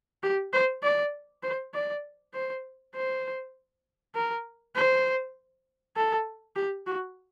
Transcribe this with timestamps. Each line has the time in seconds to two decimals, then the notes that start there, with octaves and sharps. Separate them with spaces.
0.23 G4
0.53 C5
0.83 D5
1.43 C5
1.74 D5
2.34 C5
2.95 C5
4.15 A#4
4.75 C5
5.96 A4
6.56 G4
6.87 F#4